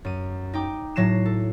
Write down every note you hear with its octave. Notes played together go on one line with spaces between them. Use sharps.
F#2 D#7
D#4 G5 D6
A2 F#3 A#6 C7 E7
A4